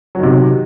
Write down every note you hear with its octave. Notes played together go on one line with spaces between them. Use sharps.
C3 D#3 F#3